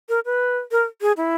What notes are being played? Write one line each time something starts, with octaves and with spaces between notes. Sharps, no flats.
A#4
B4
A#4
G#4
E4